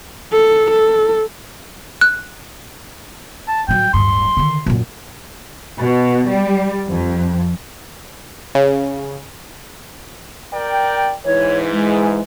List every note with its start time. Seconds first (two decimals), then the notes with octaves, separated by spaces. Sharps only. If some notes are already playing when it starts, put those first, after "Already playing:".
0.32 A4
0.71 A4
2.01 F#6
3.48 A5
3.68 A2 F#3 G5
3.94 D1 G2 C6
4.37 D3 D#3
4.66 F#2 A#2
5.79 B2
6.27 G3
6.88 F2
8.55 C#3
10.52 A#4 D5 G5
11.25 G#2 E3 C#5
11.72 G#3